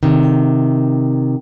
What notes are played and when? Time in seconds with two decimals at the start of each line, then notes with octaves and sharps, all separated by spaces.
0.03 C3 D#3